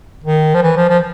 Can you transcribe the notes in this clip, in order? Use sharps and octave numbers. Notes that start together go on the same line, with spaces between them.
D#3
F3
E3
F3
F3